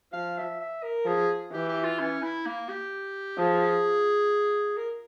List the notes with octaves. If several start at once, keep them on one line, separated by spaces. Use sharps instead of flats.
F3 F5
E5
E5
A#4
F3 G#4
E3 G4
G4
F4
C#4
E4
A#3
G4
F3 G#4
A#4